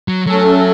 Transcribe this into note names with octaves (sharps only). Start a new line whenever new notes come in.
F#3
F#3 A3 C#4 A4